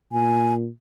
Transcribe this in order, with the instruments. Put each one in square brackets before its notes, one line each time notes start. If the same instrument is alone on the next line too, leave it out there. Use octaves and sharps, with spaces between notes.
[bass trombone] A#2 [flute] G#5